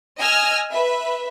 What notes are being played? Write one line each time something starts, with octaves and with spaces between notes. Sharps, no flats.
D#5 G#5 E6 F6
B4 E5